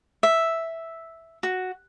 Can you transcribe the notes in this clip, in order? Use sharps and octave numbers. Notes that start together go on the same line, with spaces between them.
E5
F#4